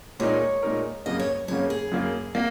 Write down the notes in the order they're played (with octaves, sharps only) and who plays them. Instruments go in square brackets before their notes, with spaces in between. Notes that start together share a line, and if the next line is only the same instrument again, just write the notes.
[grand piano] A#2 G#3 D#4 A#4 [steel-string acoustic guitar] C#5
[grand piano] A#2 G#3 D#4 A#4
[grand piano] F#2 C#3 A#3 [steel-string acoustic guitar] D#5
[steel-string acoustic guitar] C#5
[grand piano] F#2 C#3 A#3 [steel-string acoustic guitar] C#5
[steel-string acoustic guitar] G#4
[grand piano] F#2 C#3 A#3
A#3